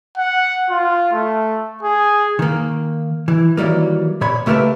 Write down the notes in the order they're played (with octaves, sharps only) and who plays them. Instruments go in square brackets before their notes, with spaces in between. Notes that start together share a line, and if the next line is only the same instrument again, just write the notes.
[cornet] F#5
F4
A3
G#4
[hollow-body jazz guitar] D#3 A#3
E3
D#3 E3 F#3 G3 A#3
A#2 C#5 B5
C#2 A3 G4 A#4 B4 A5